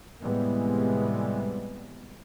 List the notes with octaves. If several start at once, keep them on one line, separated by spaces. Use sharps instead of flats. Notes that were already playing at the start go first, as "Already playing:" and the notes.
A2 C3 E3 G3 G#3 B3